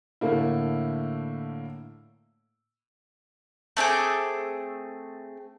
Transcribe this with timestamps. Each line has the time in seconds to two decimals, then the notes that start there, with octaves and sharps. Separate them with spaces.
0.21 A2 D3 A3 A#3 E4
3.77 A3 C4 G#4 D6